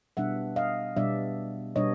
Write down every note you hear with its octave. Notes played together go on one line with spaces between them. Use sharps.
B2 G3 B3 D4 E5 F#5
D#5 F5
B2 G3 B3 D4 D5 E5
B2 G3 B3 D4 C#5 D#5